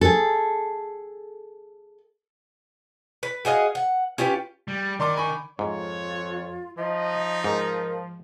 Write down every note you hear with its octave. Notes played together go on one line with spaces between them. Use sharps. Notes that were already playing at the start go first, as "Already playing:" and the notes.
G#4 A4
B4
F#4 G#4 D#5 F5
F#5
C#4 F4 G4 B4
G3
D#3 D5 C6 D6
G#5 B5 C#6
F2 G#2 F4 C#5
F3 D#4 D#5
G#2 A#4